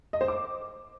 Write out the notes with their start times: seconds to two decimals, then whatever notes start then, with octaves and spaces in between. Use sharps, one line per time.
0.13 D#5
0.21 C5
0.28 D6